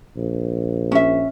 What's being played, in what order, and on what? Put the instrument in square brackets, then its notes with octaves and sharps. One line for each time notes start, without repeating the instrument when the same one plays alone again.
[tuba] A#1
[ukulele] C#4 E5